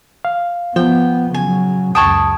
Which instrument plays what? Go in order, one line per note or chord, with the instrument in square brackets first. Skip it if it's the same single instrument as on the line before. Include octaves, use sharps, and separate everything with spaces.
[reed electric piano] F5
[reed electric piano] F3 [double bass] B3 [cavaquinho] G5
[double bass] C#3 F#3 [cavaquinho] G#5
[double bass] C#2 F#2 [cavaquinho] G5 A5 C#6 [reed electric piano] D#6 G#6